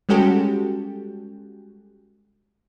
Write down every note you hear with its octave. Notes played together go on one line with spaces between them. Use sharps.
G3 G#3 C#4 F#4 G4 A4